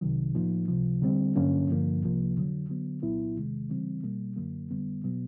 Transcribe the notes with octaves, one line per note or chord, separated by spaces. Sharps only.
C2 C3 D#3 F#3
A2 F3 A#3 D#4
C#2 C3 F3
D3 G3 C4
G2 D3 F#3 A#3 C#4
G2 D3 F3 A#3
C2 C3 F3 A#3
F2 D3 F#3
D3 F#3 B3
C2 A#2 F#3 B3 E4
E2 C3 D#3 G#3
C#3 E3 G3 C4
B2 G3 A#3
F#2 D3 F#3 A#3
F2 D3 G3 B3
B2 F#3 B3